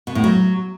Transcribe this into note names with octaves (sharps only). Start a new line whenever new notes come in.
B2
A2
F#3